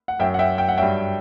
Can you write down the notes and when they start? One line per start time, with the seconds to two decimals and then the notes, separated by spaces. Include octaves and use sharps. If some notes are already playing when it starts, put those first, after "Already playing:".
0.08 F#5
0.19 F#2 F#3 E5 G5
0.34 F#5
0.39 E5 G5
0.58 G5
0.69 F#5
0.78 G2 F#3 E5 G5